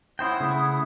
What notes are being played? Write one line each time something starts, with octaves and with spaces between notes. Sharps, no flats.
C#4 E4 C5 F#5 G5 D#6
C#3 A3 E4